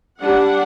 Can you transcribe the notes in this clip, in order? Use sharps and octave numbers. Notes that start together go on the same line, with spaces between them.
G3 D4 F#5